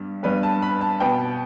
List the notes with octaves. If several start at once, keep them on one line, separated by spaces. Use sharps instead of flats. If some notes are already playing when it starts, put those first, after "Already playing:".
Already playing: G2 G3 B3
G2 G3 B3 B4
A5
B5
A5
B2 B3 G5